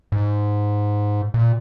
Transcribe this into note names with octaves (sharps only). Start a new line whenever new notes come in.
G#2
A#2